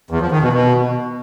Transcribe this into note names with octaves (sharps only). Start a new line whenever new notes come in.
E2
F3
D#3
B2
B2